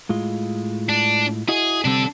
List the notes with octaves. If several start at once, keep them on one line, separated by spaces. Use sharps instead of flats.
A2 G#3 F4
D4
E4 F#4 G#4 D#5
C3 G3 C4 D4 A4